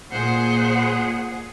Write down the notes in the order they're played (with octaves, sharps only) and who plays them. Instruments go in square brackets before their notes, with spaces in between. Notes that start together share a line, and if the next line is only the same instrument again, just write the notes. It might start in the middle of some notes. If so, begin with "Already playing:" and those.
[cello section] A#2 G#4 [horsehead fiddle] C5 F#5